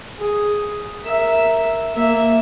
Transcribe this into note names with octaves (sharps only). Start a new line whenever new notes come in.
G#4
A#4 E5
A#3 E5